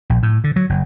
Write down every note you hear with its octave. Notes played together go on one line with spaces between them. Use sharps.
A#1
A2
D3
F#3
F#1